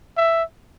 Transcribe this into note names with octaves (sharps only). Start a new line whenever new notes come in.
E5